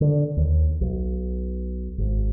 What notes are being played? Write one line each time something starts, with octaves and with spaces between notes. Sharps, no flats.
D3
D#2
B1
G#1